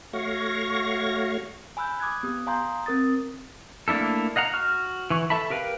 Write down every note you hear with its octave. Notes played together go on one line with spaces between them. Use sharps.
A3 F#4 C#5 F5 C#6 A#6
G#5 B5 E6 F#6 G6
D6 D#6 F#6 G#6
B3 G4 D#6
F5 G#5 A#5 C6 D#6 G6
C4 A#4 D#6 A6
A3 A#3 D4 E4 A4
D#5 F5 F#5 A#5
F#4 F6
E3 C#6
A4 E5 A5 B5
G4 A#4 B4 F5 G5